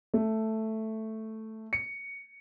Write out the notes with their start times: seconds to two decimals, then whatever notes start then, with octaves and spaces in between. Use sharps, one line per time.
0.14 A3
1.73 C#7